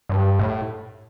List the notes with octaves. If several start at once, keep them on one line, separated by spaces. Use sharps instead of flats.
G2
A2